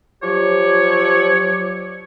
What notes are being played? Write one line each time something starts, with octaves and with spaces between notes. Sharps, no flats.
F3 F#3 G4 C#5 D5